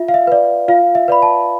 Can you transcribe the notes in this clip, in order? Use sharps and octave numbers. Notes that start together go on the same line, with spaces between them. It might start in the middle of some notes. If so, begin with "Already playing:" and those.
Already playing: F4 E5
F5
E5
B4 D5
F4 F5
E5
B4 D5 B5
A5